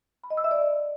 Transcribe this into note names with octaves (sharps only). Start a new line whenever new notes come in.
B5
D#5
E6
E5
D5